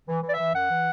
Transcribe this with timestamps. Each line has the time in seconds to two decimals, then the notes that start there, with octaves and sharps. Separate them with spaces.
0.08 E3
0.23 E3
0.28 D5
0.33 E5
0.39 E3
0.54 F#2 F#5
0.71 E3